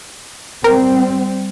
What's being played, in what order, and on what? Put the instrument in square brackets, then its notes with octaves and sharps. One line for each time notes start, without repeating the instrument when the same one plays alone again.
[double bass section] G3 C4 [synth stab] A#4